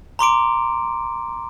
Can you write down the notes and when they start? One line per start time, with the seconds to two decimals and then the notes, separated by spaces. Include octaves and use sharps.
0.19 A#5 C6 D6 D7